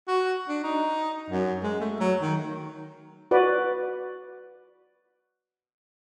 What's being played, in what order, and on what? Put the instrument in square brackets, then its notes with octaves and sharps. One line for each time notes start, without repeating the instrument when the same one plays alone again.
[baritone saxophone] F#4
D4
D#4
F#2
G#3
A3
F#3
D#3
[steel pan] F#4 B4 D5